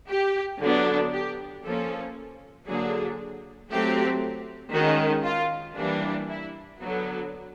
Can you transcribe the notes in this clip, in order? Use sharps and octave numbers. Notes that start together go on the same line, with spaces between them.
G4
D3 F#3 B3 D4
G4
F3 A#3 C#4 A4
D3 F#3 A#3 D4 G#4
F#3 A3 C4 G4
D#3 G#3 C#4 F#4
F4
E3 G3 A#3 D4
E4
D3 F#3 B3